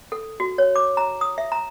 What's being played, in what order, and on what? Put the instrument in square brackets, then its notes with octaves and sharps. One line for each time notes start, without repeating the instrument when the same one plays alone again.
[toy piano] A4
F#4
C#5
D6
A#5
D#6
E5
A#5